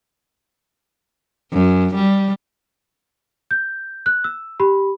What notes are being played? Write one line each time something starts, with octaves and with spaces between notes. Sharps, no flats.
F#2
G3
G6
F#6
E6
G4 B5